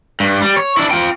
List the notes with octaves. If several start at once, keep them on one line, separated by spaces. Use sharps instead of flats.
G2
G3
C#5
D4 E4
F4 G5